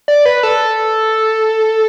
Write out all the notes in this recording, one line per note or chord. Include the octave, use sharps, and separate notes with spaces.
D5
B4
A4